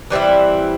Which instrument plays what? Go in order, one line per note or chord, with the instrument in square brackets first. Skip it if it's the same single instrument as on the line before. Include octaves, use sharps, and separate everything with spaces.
[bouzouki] E3 G3 C4 E4